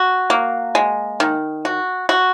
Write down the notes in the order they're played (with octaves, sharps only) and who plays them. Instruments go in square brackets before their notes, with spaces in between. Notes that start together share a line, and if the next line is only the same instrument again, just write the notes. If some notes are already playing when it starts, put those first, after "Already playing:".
Already playing: [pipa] F#4
A#3
G#3
D#3
F#4
F#4